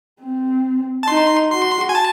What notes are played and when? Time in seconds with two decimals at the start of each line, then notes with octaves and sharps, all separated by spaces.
0.21 C4
1.03 A5
1.08 D#4 C6
1.51 F#4 C6
1.89 G#5
1.95 A5